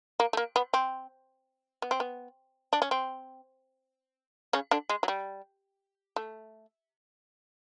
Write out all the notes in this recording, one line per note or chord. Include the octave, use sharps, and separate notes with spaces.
A#3
A3
A#3
B3
C4
B3
C4
B3
D4
C#4
C4
C#3 C#4
D3 D4
G#3
F#3
G3
A3